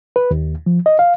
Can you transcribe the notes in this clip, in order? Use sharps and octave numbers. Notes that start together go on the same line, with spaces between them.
B4
D#2
F3
D#5
F5